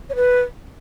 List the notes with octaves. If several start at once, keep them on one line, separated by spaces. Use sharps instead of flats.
C#5
B4